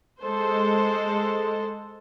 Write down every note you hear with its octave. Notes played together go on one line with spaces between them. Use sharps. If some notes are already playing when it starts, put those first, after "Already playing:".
G#3 A4 C5